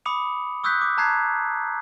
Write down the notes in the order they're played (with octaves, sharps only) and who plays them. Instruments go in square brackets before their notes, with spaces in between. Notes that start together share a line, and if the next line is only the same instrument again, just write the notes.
[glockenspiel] B5 D6 D#6 C#7 F7
C#6 D#6 E6 F#6 G6 B6
D6
A5 A#5 F#6 G#6 C7